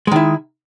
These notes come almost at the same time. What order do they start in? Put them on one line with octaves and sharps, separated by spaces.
G#3 D#3 E4